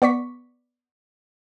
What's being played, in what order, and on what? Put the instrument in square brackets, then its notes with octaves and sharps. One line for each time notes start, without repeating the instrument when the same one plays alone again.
[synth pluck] B3 D5 C#6 B6